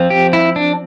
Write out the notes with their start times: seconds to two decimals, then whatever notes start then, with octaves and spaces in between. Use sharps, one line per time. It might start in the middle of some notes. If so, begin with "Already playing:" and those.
Already playing: F3 C4
0.10 G4
0.33 E4
0.56 D4